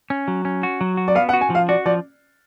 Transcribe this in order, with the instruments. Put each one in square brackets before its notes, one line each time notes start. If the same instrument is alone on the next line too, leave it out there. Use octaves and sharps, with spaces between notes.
[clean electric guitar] C#4
F#3
C#4
F#4
F#3
F#4
[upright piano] D5
[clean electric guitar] B3 [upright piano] F5
[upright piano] F#5
[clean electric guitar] F#4
[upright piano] G#5
[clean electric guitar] F3 [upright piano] F5
[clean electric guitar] F#4 [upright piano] D5
[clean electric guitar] F3 [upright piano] D5